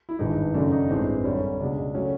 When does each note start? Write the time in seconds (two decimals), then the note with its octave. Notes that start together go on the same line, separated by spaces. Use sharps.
0.09 E4
0.19 G#1 G2 E3 G#3 D#4
0.54 F#2 C#3 F#3 A3 D4
0.72 D#4
0.89 A1 G2 E3 G#3 C4
1.24 F#2 D3 G3 C#4
1.59 C#2 B2 G#3 D4
1.95 C#3 F#3 A3 C#4